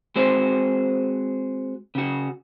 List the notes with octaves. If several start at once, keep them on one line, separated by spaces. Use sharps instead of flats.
G#3 C4 F#4 G#4 C5
C#3 F#4